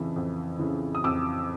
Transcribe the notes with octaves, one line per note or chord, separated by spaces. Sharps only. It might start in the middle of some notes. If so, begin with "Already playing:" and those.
Already playing: F2 C#3 E3
F2
C#3 E3
D#6
F2 D6 E6